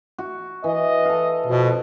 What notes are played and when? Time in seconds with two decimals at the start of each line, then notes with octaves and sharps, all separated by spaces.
0.18 F#4
0.64 E3 D#5
1.05 A4 F5
1.46 F2 B2